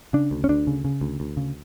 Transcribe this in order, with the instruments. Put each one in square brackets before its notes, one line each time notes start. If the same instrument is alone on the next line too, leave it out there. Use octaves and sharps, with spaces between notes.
[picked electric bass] C#3 D4
D2
C#4
D2 D4
C#3
C#3
D2
D2
C#3